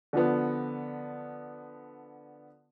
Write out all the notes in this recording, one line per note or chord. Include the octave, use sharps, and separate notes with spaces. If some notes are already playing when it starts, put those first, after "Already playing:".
D3 F3 B3